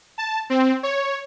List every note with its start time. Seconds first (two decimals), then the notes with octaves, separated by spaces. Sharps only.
0.18 A5
0.50 C4
0.83 C#5